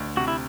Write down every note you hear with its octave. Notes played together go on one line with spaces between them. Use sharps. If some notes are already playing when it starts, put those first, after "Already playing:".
Already playing: D2
C3 F#4
E4